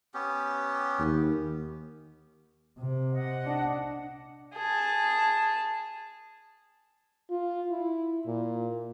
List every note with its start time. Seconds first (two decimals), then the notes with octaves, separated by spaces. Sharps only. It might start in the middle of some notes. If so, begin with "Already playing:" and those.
0.14 B3 C#4 G4
0.99 D#2
2.79 C3
3.14 D#5 F#5
3.45 D4
4.56 G#4 A5
7.30 F4
7.71 E4
8.27 A#2